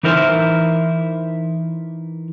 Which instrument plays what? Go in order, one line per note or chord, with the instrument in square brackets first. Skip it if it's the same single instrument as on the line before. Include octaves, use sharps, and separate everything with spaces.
[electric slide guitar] E3 D#4 E4 A#4 C5